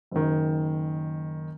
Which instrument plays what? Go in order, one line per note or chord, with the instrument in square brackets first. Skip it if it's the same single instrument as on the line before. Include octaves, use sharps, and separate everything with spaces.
[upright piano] F#1 D#3